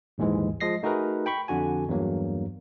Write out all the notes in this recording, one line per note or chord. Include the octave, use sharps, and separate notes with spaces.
A#1 D#2 G#2 E3 G#3
F3 G#3 D#5 A#6 C7
A3 D#4 F#4 G#4 A#4 B4
G5 B5 C#6
F2 D3 F#4 G#5
E2 G2 F#3 A#3